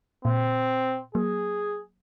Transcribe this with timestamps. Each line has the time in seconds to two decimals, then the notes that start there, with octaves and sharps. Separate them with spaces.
0.25 A#2 C4
1.15 F#3 A#3 G#4